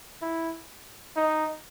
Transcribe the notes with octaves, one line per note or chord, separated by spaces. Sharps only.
E4
D#4